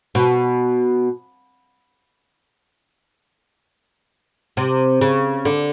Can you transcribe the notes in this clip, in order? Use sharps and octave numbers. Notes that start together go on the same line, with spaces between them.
B2
C3
C#3
D3